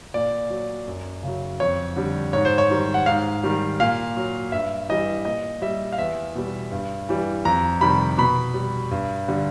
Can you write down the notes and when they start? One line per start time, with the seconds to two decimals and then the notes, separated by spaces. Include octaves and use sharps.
0.14 A#2 D5
0.50 F#3
0.88 F#2
1.23 C#3 F#3
1.60 F2 C#5
1.96 D3 G3
2.33 G#2 C#5
2.45 C5
2.58 C#5
2.70 D#3 G3
2.94 F#5
3.06 G#2 F5
3.44 D#3 G3
3.80 A#2 F5
4.17 F#3
4.52 G2 E5
4.89 E3 G3 D#5
5.25 A#2 D#5
5.62 G3 E5
5.92 F5
5.98 E2 E5
6.35 B2 G3
6.72 G2
7.09 E3 G3
7.45 F2 A#5
7.81 C3 D#3 G3 B5
8.18 B2 B5
8.54 G3
8.91 G2
9.28 D3 G3